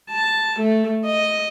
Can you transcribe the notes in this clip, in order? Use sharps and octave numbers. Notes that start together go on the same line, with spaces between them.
A5
A3
D#5